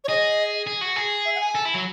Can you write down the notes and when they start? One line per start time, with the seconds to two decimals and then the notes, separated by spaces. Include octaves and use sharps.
0.04 C#5
0.09 G#4 D#5
0.67 G#4
0.81 F#4
0.96 G#4
1.25 E5
1.35 F#5
1.40 G#5
1.55 A4
1.65 E4
1.74 F#3